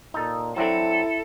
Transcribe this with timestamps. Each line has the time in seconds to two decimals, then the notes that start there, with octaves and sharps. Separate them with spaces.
0.14 A#2 D#4 A4
0.56 F#3 C4 D4 E4 A4